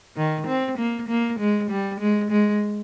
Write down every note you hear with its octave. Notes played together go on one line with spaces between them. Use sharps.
D#3
C4
A#3
A#3
G#3
G3
G#3
G#3